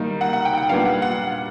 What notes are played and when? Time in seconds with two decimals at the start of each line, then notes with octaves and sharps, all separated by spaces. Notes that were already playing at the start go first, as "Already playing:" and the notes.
Already playing: D#3 G3 A#3 D#4
0.21 F#5
0.33 F#5
0.45 G5
0.58 F#5
0.69 A#2 G3 B3 D4 F5
0.85 F#5
1.02 F#5